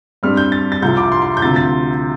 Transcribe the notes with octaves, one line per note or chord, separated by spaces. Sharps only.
G2 G3 C4 F6
G6
A6
A6
C2 C3 F3 G6
D6
C6
C6
G6
D2 C3 F3 C4 A6
A6